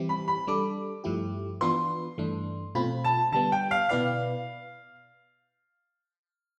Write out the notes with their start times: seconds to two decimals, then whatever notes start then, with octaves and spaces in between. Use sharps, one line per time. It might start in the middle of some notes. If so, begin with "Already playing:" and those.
Already playing: E3 G3 C4 E4 G4
0.09 B5
0.28 B5
0.47 G3 D4 A4 D6
1.04 G2 F3 A3 E4 G4
1.61 E3 B3 D4 F4 B4 C6
2.18 G2 E3 A3 D4
2.75 B2 A3 C4 F4 B5
3.04 A5
3.32 D3 G3 B3 A5
3.52 G5
3.71 F5
3.89 B2 B3 E4 B4 D5 F5